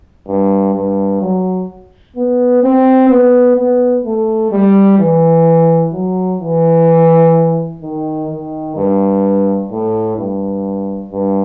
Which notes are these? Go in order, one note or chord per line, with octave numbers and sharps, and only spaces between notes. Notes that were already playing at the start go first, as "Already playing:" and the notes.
G2
G2
F#3
B3
C4
B3
B3
A3
G3
E3
F#3
E3
D#3
D#3
G2
A2
G2
G2